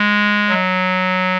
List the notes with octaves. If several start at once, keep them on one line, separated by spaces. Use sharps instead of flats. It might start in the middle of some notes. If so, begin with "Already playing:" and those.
Already playing: G#3
F#3